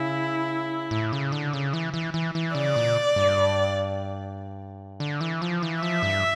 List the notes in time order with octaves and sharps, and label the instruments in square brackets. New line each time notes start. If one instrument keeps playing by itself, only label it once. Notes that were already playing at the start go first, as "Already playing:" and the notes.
Already playing: [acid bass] C#3 [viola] E4
[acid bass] A2
C#3
D3
C#3
E3
E3
E3
E3
[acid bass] C#3 [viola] D5
[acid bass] A#2
G2
D3
E3
F3
E3
[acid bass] F3 [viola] E5
[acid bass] G2